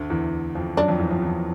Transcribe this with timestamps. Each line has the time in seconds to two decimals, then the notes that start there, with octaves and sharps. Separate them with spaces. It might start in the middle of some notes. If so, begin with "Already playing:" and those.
Already playing: D2 D3
0.10 E2 E3
0.55 F2 F3
0.77 F#2 F#3 D4
0.88 F2 F3
0.99 E2 E3
1.10 F2 F3
1.22 E2 E3